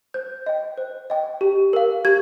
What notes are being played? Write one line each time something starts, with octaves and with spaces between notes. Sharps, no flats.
C5 G6
D#5 G5
C5
D#5 G5
G4
A#4 F5
G4 G#6